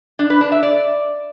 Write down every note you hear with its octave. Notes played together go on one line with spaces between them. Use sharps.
D4
B4
D4
E5
D5